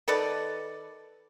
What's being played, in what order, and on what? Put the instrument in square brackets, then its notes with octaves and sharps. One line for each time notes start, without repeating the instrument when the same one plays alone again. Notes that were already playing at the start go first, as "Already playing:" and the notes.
[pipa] D#3 A4 B4 D5